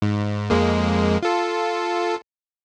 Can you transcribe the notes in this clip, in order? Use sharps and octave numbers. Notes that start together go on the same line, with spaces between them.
G#2
F2 G#3 A#3
F4 A4